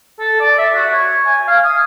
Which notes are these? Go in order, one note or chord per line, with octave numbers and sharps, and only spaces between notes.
A4
D5
E5
F#4
C#5
G#5
F5
D#6